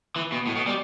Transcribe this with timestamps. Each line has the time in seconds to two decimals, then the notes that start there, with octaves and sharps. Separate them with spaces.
0.16 E3
0.32 B2
0.47 A2
0.56 B2
0.67 G3